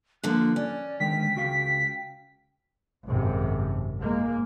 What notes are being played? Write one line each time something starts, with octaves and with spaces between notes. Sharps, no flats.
D3 F3 A#3 F#6
C#4 D5
D3 D#3 G#3 G5 B6
C#2 F#4 F5
G#1 F#2 C3
G#2 G#3 A#3